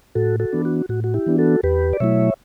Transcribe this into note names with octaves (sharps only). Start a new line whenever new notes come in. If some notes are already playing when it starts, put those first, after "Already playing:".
A2 F#4 A4
F#4 A4
E3 B3 D4
F#4
A2 F#4
F#4
E4 G4
E3 B3 D4
F#4 A4
E2 G4 B4
D5
B2 F#3 A3 E4 C#5 E5